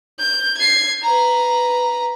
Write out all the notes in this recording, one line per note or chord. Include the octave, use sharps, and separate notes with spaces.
G6
G#6 C7
B4 A#5